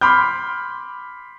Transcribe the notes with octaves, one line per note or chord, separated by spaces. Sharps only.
B5 C6 D6 F6 G6